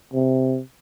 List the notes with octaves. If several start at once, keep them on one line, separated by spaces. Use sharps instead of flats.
C3